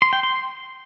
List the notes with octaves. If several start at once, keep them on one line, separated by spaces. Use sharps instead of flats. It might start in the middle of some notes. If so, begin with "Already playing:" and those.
C6
G5
C6